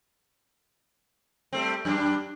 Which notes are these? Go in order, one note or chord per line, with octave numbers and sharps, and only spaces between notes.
G3 A3 C4
F#2 G3 D4